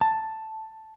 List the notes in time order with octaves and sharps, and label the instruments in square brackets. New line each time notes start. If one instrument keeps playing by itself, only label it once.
[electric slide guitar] A5